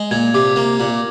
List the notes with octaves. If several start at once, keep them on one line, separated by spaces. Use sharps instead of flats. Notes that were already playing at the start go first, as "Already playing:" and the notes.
Already playing: G#3
A#2 G#6
C3 D6
A#3
A#2